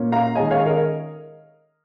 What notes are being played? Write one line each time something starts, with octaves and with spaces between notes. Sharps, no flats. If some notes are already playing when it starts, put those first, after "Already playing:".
Already playing: A#2 A#3 C#4
F5 A#5
D#3 G#3 C#4 D#5 G#5
C#5 F5
A#4 D#5